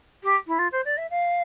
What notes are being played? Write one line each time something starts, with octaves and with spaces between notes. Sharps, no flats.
G4
E4
F4
C5
D5
E5
F5